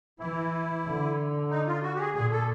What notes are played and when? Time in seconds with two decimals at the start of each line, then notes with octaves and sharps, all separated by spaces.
0.19 E3 E4
0.85 D3
1.50 D#4
1.67 F4
1.82 F#4
1.95 G4
1.98 G#4
2.15 A#2 G#4
2.31 A4